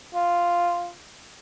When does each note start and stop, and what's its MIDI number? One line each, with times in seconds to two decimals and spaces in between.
0.15 0.91 65